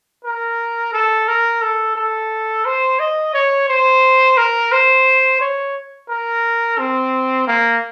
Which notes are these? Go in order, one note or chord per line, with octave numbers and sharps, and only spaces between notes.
A#4
A4
A#4
A4
A4
C5
D#5
C#5
C5
A#4
C5
C#5
A#4
C4
A#3